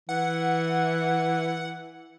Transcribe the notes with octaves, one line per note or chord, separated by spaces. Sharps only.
E3 F#5